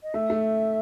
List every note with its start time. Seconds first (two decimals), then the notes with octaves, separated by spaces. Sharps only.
0.03 D#5
0.14 A3 E5
0.30 A3